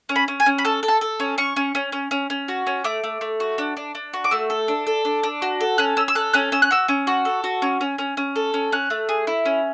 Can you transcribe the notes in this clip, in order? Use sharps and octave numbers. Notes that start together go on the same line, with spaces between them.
C#4
B5
C#4
G#5
C#4
B5
A4 A5
A4
A5
A4
C#4
C#4 C#6
C#4
C#4
C#4
C#4
C#4
F#4
C#4
A3 D6
A3
A3
F#4
D4
D4
D4
F#4
D6
A3 E6
A4
D4
A4
D4
D4
F#4
A4
C#4 F#6
C#4 E6
E6
A4 F#6
C#4 F#6
C#4 E6
F#6
F#4 E6
C#4
F#4
A4
F#4
C#4
C#4
C#4
C#4
A4
C#4
C#4 F#6
A3
G#4
E4
C#4